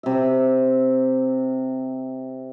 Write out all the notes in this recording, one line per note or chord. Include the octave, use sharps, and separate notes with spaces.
C3 E5